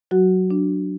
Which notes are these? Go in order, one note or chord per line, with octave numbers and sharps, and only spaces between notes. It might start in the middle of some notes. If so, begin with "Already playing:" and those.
F#3 F#4
D4